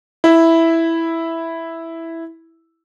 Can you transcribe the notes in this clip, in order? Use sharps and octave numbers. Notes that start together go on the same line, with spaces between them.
E4 E5